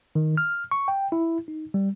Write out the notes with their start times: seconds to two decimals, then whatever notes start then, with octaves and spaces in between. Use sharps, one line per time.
0.15 D#3
0.37 F6
0.71 C#6
0.88 G5
1.12 E4
1.48 D#4
1.74 G3